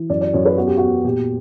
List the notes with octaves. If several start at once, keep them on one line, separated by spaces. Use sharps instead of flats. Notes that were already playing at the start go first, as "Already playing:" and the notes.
Already playing: E3
F#2 D5
D5
F#2 C#5
B4
E2 F#4
G4
E2 F#4
A#2 G4